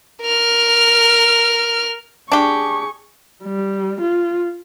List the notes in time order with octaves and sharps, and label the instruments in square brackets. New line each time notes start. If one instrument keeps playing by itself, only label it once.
[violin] A#4 F6
[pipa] D4 G4 [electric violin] G#4 C#6
[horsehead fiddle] G3
F4